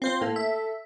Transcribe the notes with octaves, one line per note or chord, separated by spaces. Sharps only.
C4 F4 C5 C6
A2 A#3 A4
E5